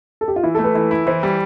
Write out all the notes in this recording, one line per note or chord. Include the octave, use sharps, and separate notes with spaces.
A4
G4
F4
E3 E4
A4
A3
B4
E3
E4
E3 C5
G3